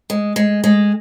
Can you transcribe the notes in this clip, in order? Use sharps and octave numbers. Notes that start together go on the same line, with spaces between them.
G#3
G#3
G#3